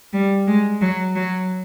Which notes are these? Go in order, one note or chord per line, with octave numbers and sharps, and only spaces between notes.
G3
G#3
F#3
F#3